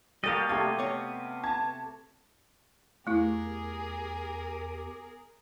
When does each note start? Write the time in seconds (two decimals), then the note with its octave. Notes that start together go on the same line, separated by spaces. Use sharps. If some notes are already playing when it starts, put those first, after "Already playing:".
0.24 G3 A#3 F#4 G4 A4 D#5 F5 A6
0.49 C3 A3 G4 D6 G#6
0.79 B3 C#5
1.43 A5 G#6
3.07 E2 A3 E4 G4 G#4 A#4